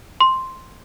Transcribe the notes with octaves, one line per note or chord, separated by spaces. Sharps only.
C6